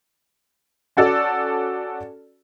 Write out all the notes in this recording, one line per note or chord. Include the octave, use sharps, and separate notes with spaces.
C#4 F#4 A4 D5 A5